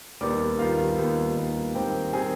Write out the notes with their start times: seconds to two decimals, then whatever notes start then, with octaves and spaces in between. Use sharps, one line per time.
0.21 D#2 D#3 G3 B3 D5 D6
0.59 D#2 D#3 G3 B3 F4 F5
0.97 D#2 D#3 G3 B3
1.36 D#2 D#3 G3 B3
1.75 G#2 D#3 G3 C4 G4 G5
2.13 D#3 G3 C4 G#4 G#5